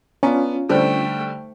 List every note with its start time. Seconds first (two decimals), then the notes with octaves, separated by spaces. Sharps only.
0.23 B3 C#4 D4 F4 A#5
0.69 D3 G3 A3 D#4 C5 G5